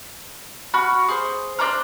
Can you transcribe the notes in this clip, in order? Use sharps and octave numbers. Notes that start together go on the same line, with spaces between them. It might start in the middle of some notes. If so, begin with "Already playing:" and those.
F#4 B5 F6
G#4 C5
D4 C5 A#5 F6